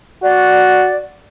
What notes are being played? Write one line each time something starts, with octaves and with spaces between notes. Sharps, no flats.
F#4 D5